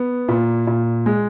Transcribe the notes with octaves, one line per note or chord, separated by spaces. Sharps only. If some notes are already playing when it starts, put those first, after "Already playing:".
Already playing: B3
A#2
A#2
G#3